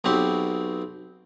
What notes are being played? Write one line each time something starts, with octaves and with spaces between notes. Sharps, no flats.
B1 B2 C4 G4